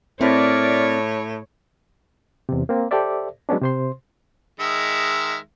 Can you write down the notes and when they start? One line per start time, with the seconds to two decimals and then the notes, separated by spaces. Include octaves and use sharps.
0.21 A2 C4 E4 A#4 C#5 D5
2.49 E2 C3
2.69 A#3 C4
2.91 G4 A4 C5 D5 E5
3.49 F#3 G#3 B3 C#4 D4
3.62 C3 C5 C6
4.60 D#3 G#3 E5